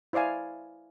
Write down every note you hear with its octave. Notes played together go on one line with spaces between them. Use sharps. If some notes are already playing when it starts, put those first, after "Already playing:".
E4 C5 D5 F5 G#5